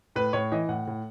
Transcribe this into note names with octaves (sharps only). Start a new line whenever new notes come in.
A2 B4
A2 C#5
E3 D#5
A2 F#5
A2